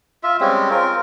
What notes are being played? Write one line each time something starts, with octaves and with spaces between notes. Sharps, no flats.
F4 E5
G3 G#3 C4 C#4
C4 F4 A#4